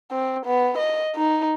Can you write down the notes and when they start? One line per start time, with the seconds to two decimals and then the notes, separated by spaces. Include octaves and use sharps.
0.11 C4
0.46 B3
0.78 D#5
1.16 D#4